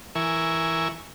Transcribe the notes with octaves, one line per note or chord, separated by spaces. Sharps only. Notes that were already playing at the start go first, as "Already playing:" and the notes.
E3 A#4 E5 G#5 C#6